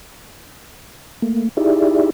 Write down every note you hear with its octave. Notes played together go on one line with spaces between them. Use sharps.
A3 A#3
D#4 E4 G4 G#4 D5 E5